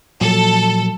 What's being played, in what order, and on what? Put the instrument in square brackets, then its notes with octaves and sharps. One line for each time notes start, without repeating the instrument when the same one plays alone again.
[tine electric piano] A#2 F3 F#3 [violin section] A4